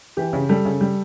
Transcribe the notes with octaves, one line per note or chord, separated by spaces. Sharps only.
E3 G4
C#3
G3 A4
C#3
G3